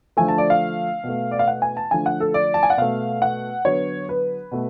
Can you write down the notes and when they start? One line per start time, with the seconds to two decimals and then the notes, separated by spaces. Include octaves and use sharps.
0.17 D3 F3 A3 G#5
0.28 A5
0.38 D5
0.50 F5
1.04 B2 A3
1.31 D5
1.39 F5
1.48 F#5
1.62 G#5
1.77 A5
1.91 D3 F3 A3 G#5
2.06 F#5
2.20 A4
2.34 D5
2.54 A5
2.63 G#5
2.70 F#5
2.77 B2 A3 F5
3.22 F#5
3.65 D3 F#3 B3 C#5
4.09 B4
4.52 B2 A3